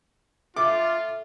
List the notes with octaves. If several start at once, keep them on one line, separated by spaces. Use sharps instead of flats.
A3 F4 D6